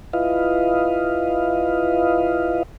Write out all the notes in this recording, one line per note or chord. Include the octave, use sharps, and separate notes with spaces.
E4 F4 B4 D#5 F5